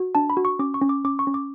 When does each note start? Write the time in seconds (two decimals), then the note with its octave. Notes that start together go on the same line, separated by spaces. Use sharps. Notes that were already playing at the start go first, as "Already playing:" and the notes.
Already playing: F#4
0.15 D4 A5
0.30 B5
0.37 F#4
0.45 C#6
0.59 C#4 D6
0.74 C#6
0.81 C#4
0.89 D6
1.04 C#4 D6
1.19 C#6
1.27 C#4
1.34 D6